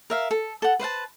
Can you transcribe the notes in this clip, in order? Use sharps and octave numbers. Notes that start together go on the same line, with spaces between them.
A#4 E5 F5
A4
A4 F#5
B4 C5 F#5 A5